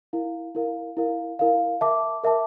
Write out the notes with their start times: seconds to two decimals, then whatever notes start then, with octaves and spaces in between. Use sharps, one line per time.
0.13 E4 A#4 F5
0.55 E4 A#4 F5
0.97 E4 A#4 F5
1.39 E4 A#4 F5
1.81 A#4 E5 A5 D6
2.24 A#4 E5 A5 D6